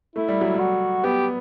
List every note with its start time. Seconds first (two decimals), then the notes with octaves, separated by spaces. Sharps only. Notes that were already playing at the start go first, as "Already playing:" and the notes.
0.15 A3 E4
0.28 G3
0.41 F#3
0.54 G3
0.59 F#4
1.04 B3 G4